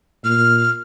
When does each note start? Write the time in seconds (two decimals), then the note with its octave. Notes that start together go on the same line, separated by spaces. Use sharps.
0.25 A#2 F6